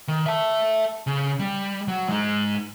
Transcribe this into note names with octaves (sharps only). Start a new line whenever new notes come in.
D#3
E5 A5
C#3
G3
F#3
G#3 D#4